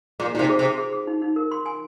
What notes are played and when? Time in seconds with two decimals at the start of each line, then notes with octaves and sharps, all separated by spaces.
0.20 A#2 G#4
0.35 A#2 D#4
0.39 C3
0.49 G#4
0.59 C3
0.64 G#4
0.78 G#4
0.93 G#4
1.07 D#4
1.22 D#4
1.36 A#4
1.51 C6
1.66 G#5